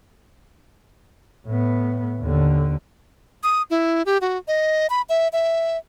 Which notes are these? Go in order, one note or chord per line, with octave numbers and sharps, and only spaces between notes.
A2 B3
D#2 D3
D#6
E4
G4
F#4
D#5
B5
E5
E5